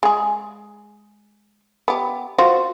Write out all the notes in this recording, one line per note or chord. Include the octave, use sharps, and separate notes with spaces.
G#3 G#4
B3 G4
F4 F#4 C5